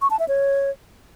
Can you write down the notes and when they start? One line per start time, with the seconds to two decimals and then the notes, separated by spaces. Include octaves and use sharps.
0.02 C#6
0.11 A5
0.19 E5
0.28 C#5